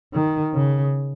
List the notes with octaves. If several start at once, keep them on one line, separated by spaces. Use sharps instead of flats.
D#3
C#3